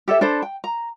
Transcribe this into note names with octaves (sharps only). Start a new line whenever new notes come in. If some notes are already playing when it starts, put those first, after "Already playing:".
G4 A4 C#5 E5
D4 A4 C5 B5
G5
A#5